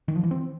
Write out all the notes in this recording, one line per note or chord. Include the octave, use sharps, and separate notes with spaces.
D#3
F3
E3
C4